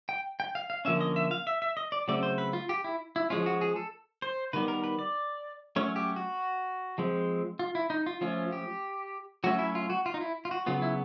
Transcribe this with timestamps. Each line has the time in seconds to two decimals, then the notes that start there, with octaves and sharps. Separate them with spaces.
0.09 G5
0.40 G5
0.55 F5
0.70 F5
0.85 D3 F3 A#3 C#4 E5
1.01 D#5
1.16 E5
1.31 F5
1.47 E5
1.62 E5
1.77 D#5
1.92 D5
2.08 C#3 F#3 A3 C4 D5
2.23 C5
2.38 B4
2.53 F4
2.69 G4
2.84 E4
3.16 E4
3.30 F3 G#3 C#4 F4
3.46 F#4
3.61 G#4
3.76 A4
4.22 C5
4.53 D#3 G3 B3 B4
4.68 A#4
4.84 B4
4.99 D5
5.76 F#3 A3 C#4 C#5
5.96 G4
6.16 F#4
6.98 F3 G#3 C4
7.59 F4
7.75 E4
7.90 D#4
8.06 F4
8.21 F3 A3 C#4 F4
8.52 G4
9.44 F#3 A3 C#4 F#4
9.59 E4
9.75 F4
9.90 F#4
10.06 F4
10.14 D#4
10.21 E4
10.45 F4
10.51 F#4
10.66 C#3 F#3 B3 F4
10.82 E4